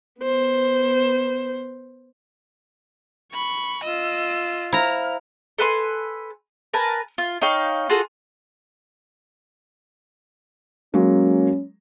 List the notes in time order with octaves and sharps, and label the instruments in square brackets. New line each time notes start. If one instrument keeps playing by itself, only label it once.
[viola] B3 C5
[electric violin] B5 C#6
[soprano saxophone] F4 [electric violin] D#5 E6
[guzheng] E4 A#5 [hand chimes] C5 F5 [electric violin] F6
[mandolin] A4 B4 G#5 C6
A#4 B4 G#5 A5
F4
D#4 C#5 F5 G5
F4 F#4 G#4 A4
[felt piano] F#3 G#3 A#3 [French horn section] C#4